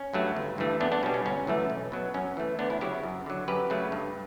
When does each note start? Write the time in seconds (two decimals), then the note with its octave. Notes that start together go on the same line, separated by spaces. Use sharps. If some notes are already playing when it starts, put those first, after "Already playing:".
Already playing: C#4
0.14 G2 F#3 A3
0.36 G1
0.58 G2 E3 A3
0.80 E2 B3 D4
0.92 B3 D4
1.03 B2 C#4
1.06 G3
1.14 C#4
1.26 G1 C#4
1.47 F#2 E3 A3
1.70 B1
1.92 B2 F#3
2.14 F#2 C#4
2.37 E3 A3
2.59 D2 B3 D4
2.70 C#4 E4
2.81 C#3 F#3 E4 G4
3.03 F#2
3.26 D3 F#3
3.48 F#2 G4 B4
3.70 C#3 F#3 A3
3.92 G2